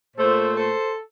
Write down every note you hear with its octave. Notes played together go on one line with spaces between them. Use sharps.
A#2 A3 A4 C5
A4 C5